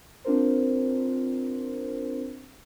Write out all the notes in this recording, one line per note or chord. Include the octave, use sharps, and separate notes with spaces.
C4 D4 F4 A#4 C5